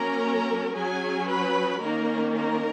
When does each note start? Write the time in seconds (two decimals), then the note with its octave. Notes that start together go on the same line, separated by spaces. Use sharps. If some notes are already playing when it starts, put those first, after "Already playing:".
Already playing: F#3 A#3 C#4 A#4 A#5
0.74 F#3 C#4 G#4 G#5
1.28 B4 B5
1.82 D#3 A#3 C#4 A#4 A#5
2.36 A#4 A#5